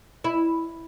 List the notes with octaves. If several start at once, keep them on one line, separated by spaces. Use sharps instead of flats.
E4